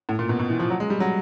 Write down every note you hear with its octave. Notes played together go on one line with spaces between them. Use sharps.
A2
A#2
B2
B2
E3
F3
F#3
G#3
G3
F#3